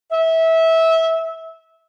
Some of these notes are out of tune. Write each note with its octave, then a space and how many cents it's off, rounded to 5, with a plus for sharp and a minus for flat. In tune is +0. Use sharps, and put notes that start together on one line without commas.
E5 -20